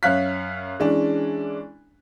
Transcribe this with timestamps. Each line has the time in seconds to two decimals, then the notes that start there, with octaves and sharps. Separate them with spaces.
0.03 F#2 C#5 E5 F5 F#6 B6
0.80 E3 G#3 C#4 D4